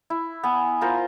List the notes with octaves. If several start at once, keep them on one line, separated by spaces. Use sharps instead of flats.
E4
B3 G#5
F4 A#4 C5